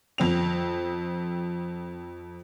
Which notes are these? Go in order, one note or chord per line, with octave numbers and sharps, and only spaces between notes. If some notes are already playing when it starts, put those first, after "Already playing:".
F2 C4 F7